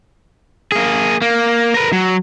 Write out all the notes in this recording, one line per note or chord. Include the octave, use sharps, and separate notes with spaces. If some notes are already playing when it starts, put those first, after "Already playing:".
A#3 G#4
A#3
A#4 B4
F#3